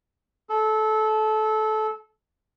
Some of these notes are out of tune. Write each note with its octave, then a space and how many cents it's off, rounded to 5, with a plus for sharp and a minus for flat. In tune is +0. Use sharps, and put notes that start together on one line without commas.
A4 -20